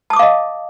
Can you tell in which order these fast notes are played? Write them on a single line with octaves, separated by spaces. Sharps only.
A5 D#6 D6 F5 D#5